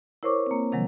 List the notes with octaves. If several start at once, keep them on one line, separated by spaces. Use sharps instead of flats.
E4 A#4 C5 C#5 C#6 D6
A#3 C4
C3 D#3 F3 F#3 G#3